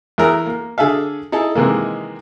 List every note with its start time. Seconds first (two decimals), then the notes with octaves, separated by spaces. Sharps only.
0.18 E2 E4 G#4 A#4 A#5
0.46 A#3
0.78 D3 G#4 A4 E5 F5
1.32 D#4 E4 G#4 A4
1.55 C3 D#3 E3 G#3 A#3